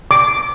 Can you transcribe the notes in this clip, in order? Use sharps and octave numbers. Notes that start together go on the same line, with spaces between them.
D6